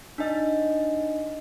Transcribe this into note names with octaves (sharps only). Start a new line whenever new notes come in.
D4 D#4 D#5